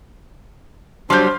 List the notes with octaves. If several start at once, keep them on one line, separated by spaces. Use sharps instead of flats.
F#3 G3 D4 C5 C6 F6 G6